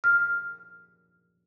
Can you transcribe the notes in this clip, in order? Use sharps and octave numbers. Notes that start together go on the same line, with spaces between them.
F6